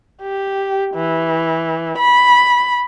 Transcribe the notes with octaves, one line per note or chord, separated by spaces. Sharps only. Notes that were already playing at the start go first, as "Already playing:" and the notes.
G4
E3
B5